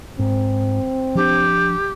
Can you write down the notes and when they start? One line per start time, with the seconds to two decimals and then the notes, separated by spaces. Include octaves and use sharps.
0.19 G#2 C4
1.15 F3 D4 G4